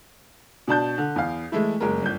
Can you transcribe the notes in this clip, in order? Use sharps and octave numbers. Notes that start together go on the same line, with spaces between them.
B2 D4 A5 G6
D3
E2 F5
E3 G#3 A3 E4
F#1 G#3 A#4
G1 G6